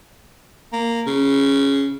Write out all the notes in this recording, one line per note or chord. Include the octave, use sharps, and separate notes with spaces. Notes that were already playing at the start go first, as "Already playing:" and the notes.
A#3
C#3